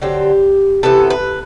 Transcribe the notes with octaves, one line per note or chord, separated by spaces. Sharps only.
D3 F#3 C4 G4
C3 E3 B3 A4
B4